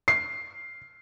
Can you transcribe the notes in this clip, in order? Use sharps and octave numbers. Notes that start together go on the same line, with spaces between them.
C7